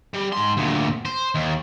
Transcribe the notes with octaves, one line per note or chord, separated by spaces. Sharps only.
G3
G#2 C6
D2 A#2
C5
D#2